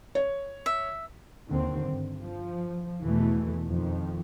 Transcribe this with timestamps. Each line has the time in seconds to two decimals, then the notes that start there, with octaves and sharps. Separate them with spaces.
0.15 C#5
0.66 E5
1.49 D#2 D3 D#3 C4
1.85 G2
2.21 F3
3.02 E2 B2 E3 A3
3.64 F2 D#3 F3